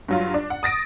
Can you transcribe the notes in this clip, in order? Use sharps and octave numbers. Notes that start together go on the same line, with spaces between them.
G2 F#3 F4
D4
F#5
D#6 A6 A#6 D7